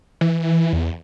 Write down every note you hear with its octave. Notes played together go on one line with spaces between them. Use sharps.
E3
E2